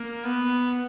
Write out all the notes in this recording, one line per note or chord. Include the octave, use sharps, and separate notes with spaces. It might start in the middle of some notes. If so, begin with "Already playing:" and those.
Already playing: A#3
B3